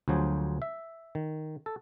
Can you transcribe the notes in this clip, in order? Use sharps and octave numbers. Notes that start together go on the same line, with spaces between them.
D2 F3 F#3 G#4 C5
E5
D#3
A4